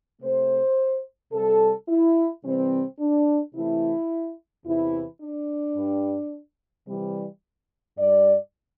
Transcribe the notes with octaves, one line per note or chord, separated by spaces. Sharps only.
C3 A3 C5
C3 G3 A4
E4
C3 E3 G3 C4
D4
C3 E3 A3 E4
E2 C3 E3 E4
D4
G2 G3
C3 E3 G3
G2 G3 D5